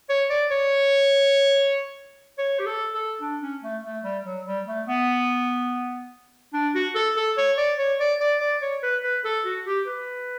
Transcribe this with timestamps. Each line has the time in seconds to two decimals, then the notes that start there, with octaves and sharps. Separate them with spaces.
0.09 C#5
0.30 D5
0.51 C#5
2.38 C#5
2.59 G4
2.66 A4
2.94 A4
3.21 D4
3.41 C#4
3.63 A3
3.84 A3
4.04 G3
4.26 F#3
4.46 G3
4.67 A3
4.88 B3
6.54 D4
6.75 F#4
6.95 A4
7.17 A4
7.38 C#5
7.58 D5
7.79 C#5
8.00 D5
8.21 D5
8.41 D5
8.62 C#5
8.83 B4
9.03 B4
9.25 A4
9.45 F#4
9.67 G4
9.87 B4